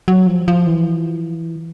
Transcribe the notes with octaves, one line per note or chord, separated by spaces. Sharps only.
F#3
F3
F3
E3